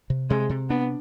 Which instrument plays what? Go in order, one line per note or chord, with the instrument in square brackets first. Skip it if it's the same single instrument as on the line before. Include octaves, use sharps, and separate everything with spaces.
[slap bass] C3
[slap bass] C3 [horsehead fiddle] G#3
[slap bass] C3
[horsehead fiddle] B3 [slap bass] D4